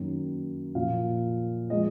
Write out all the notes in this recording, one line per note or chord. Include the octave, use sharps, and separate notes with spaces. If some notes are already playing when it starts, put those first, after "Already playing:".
Already playing: F#2 D#3 A#3
A#2 F3 A#3 F5
F3 G#3 D#5